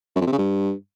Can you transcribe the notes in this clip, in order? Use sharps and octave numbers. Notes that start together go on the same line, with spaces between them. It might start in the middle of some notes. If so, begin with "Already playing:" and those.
F#2
F2
C3
C#3
G2